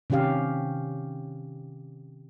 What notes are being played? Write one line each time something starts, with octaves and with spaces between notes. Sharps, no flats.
C3 D#3 C#4 G4 F5